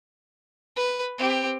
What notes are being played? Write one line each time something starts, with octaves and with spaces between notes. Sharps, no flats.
B4
C4 G4